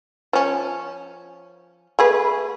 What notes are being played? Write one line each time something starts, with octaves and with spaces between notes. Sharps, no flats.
F3 C#4
A3 G#4 B4